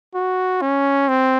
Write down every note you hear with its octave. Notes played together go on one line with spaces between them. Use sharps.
F#4
C#4
C4